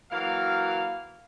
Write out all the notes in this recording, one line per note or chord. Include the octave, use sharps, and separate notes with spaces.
E3 F#3 A#3 F5